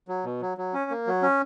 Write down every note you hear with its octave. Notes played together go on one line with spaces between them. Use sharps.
F#3
B2
F#3
F#3
C#4
A#3
F#3
C#4